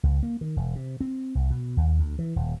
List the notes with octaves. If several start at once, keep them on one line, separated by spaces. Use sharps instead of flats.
C#2
A#3
D#3
E1
C3
C4
C2
B2
D#2
D2
E3
D#1